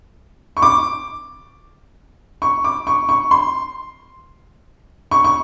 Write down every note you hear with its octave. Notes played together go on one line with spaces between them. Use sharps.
C#6
D6
C#6
D6
C#6
C#6
C6
C#6
C#6